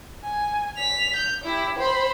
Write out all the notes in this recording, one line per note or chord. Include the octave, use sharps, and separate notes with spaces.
G#5
B6 F7
G6
E4 G4
C5 B5